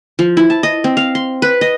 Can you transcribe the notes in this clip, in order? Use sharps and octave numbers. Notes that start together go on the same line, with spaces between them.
F3
E4
A5
D#5
C4
F5
C6
B4
D#5